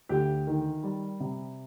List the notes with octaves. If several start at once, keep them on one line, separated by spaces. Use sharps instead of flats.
D2 G4
D#3
G3
C3